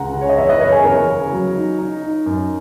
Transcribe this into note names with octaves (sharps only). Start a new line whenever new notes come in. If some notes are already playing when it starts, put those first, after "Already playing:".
Already playing: C#2 F#5 A#5
C#3
C#5
D#5
E2 C#5 E5
B4 D#5
F#1 A#4 C#5
G#4 B4
E2 A#4 C#5
C#3
F#3
D#4
D#4
D#4
F#2